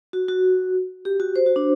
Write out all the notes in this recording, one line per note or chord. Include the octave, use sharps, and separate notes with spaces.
F#4
F#4
G4
F#4
C5
F#4
D4